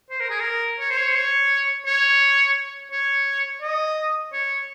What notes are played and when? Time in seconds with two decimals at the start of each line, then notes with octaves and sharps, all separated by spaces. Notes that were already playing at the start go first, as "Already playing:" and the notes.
0.10 C5
0.20 A#4
0.30 G#4
0.40 A#4
0.80 C#5
0.90 C5
0.98 C#5
1.09 C5
1.15 C#5
1.86 C#5
2.92 C#5
3.62 D#5
4.33 C#5